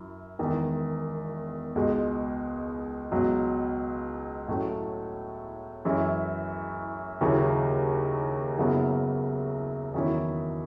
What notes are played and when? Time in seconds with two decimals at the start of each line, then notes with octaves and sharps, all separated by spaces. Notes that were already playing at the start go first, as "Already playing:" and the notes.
Already playing: F#2 E4
0.39 E1 E2 D#3
1.75 C#2 B2 G#3
3.11 C#2 B2 F#3
4.48 A2 F#3 A3 C#4
5.85 F#2 E3 G#3 C#4 E4
7.21 D#2 C#3 F#3 C#4 E4
8.58 F#1 F#2 C#3 F#3 B3
9.93 E2 D#3 F#3 C#4 E4